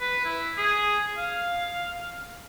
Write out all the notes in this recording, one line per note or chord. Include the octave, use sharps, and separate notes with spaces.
B4
E4
G#4
F5